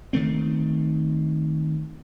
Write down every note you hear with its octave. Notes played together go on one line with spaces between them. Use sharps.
D#3 E3 A3 C4